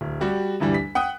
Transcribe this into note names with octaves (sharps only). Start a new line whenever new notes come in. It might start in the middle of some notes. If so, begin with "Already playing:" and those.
D1
G3 F#4 G4
D2 G2 E3 G3
B6
F#5 G5 D#6 F#6